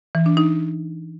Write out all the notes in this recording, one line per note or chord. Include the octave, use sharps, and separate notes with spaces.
E3
D4
D#4